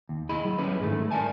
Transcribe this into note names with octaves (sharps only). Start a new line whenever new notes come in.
D#2
E4 G#4 D#5 B5
F#3
C#4 E4 G#4 B4
G#2 D3 D#3 A3
A#4 D5 E5 G#5 A5